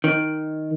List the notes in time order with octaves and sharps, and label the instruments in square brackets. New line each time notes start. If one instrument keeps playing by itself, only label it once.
[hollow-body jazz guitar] D#3